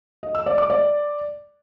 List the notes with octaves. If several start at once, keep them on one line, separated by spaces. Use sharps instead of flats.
D#5
E6
D5
D6
D5